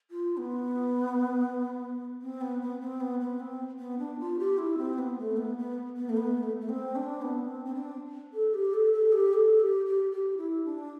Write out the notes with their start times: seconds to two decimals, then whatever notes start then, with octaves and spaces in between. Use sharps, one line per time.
0.11 F4
0.37 B3
2.22 C4
2.41 B3
2.62 B3
2.81 C4
3.01 B3
3.20 B3
3.40 C4
3.79 B3
3.99 D4
4.20 F4
4.39 G4
4.58 E4
4.78 C4
4.98 B3
5.19 A3
5.37 B3
5.58 B3
5.97 B3
6.09 A3
6.17 B3
6.43 A3
6.61 A3
6.69 C4
6.96 D4
7.22 B3
7.49 C4
7.65 C4
7.75 D4
8.34 A4
8.54 G4
8.74 A4
8.93 A4
9.13 G4
9.33 A4
9.60 G4
9.86 G4
10.12 G4
10.38 E4
10.65 D4